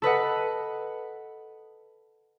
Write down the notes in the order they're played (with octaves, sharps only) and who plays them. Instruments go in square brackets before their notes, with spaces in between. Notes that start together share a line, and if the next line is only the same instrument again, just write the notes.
[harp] A4 B4 D#5 F#5